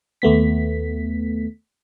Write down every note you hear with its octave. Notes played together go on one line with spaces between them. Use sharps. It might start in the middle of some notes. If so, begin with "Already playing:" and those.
D#2 A3 B3 B6